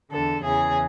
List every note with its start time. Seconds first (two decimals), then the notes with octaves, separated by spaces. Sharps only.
0.11 E2 D3 A4
0.44 E2 C#3 E3 G#4